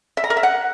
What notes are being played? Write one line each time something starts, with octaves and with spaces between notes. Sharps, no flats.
E5
A#5
A#4
E5
F#5